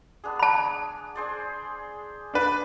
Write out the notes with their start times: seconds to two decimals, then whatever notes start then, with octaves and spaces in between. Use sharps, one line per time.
0.24 B3 D4 G#4
0.39 F#5 A5 B5
1.15 G#4 C5 D5
2.34 D4 B4